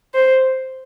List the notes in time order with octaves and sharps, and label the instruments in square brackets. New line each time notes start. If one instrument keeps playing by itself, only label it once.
[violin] C5